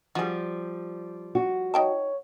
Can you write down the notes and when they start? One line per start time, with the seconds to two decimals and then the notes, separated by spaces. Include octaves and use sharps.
0.15 F3 G3 F#4 G#4
1.35 F#4
1.74 D#4 C#5 G5 A5